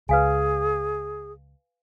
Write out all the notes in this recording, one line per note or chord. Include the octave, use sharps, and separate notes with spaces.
C#2 G#4 B4 F5 G#5